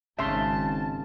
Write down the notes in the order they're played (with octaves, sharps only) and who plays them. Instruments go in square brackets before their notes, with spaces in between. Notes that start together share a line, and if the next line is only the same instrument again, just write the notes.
[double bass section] G#1 [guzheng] C#3 [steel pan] E5 C6 [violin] A5